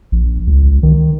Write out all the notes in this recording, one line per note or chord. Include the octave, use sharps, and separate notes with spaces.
A#1
C#2
D#3